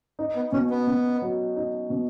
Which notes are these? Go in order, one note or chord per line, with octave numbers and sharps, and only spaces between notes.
D#4
B3
B2 C#4
B3
B2
F#3
D#4
B2